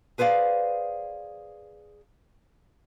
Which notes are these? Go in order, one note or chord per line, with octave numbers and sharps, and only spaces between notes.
G#4 B4 C5 D5 F5